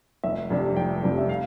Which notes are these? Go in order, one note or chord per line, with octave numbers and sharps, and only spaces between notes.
F1 E5
F2 C3 G3 D4
F1 G5
F2 C3 G3 D4
E5
F5